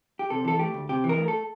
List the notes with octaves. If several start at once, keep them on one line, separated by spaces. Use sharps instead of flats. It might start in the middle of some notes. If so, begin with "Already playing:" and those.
G4
C3 A4
E3 A4
A3 G4
D2
C3 G4
E3
A#4
A3
A4